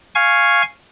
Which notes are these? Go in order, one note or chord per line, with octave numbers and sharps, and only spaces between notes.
F5 G#5 C#6